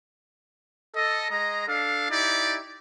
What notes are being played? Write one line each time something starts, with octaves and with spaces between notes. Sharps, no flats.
A4 D#5
G#3 D#5 A#5
D4 A4 F5
D#4 E4 G4 D5